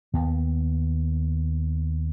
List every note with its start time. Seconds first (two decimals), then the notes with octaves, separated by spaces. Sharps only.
0.13 D#2 B3